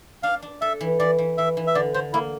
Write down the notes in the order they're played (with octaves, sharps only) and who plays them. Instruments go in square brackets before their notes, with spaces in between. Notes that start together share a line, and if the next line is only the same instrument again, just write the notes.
[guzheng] D4 [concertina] F5
[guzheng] D4
[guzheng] A4 [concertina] E5
[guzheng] E3
[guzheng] E3 [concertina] D5
[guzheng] E3
[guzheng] E3 [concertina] E5
[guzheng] E3
[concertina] E5
[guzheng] D3 [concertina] D5
[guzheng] D3 [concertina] C5
[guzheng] A#3 [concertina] E4